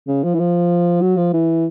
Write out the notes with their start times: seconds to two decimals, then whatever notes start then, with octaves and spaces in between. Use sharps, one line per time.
0.07 C#3
0.24 F3
0.34 E3
0.39 F3
1.01 F#3
1.17 F3
1.33 E3